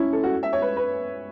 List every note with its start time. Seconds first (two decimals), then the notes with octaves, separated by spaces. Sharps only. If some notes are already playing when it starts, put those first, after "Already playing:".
Already playing: C#4 E4
0.13 A4
0.23 F#4
0.43 E5
0.53 C#5
0.62 B4
0.77 B4